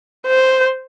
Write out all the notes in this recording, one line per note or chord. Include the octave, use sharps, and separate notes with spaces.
C5